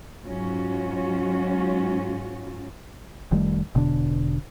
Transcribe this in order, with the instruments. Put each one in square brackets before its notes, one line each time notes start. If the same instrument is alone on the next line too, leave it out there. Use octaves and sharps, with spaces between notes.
[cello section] G#2 F#3 C#4 F4 F#4
[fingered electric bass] F1 D#3 G3 A3
E1 B2 D3 D4